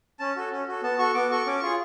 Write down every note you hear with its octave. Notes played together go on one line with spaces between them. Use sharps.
C#4 A5
F#4 A4
C#4
F#4 A4
B3 A5
F#4 A4 C#6
B3 D6
F#4 A4 C#6
C#4 D6
F4 G#4 C#6